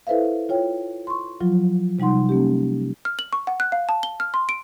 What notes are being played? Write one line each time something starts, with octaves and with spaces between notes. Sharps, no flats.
E4 A4 B4 C5 E5 F5
F4 C#5 G5
C6 C#6
F3 F#3 F4
C3 G3 D#4 F#5 C6
A#3 C#4 G4
F6
F#7
C#6
F#5
F#6
F5
A5
G7
F6
C6
D7